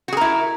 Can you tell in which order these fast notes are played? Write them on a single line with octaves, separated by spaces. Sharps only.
F#4 G#4 A#4 E4